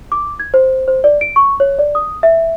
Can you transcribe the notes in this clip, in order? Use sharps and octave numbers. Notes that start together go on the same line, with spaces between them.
D6
G#6
C5
C5
D5
D7
C#6
C#5
D5
D#6
E5